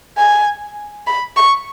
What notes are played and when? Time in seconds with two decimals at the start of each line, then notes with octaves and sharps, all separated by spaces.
0.18 G#5
1.07 B5
1.36 C#6